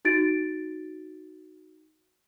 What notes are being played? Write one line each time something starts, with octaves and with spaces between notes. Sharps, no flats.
D#4 F#4 A6 D7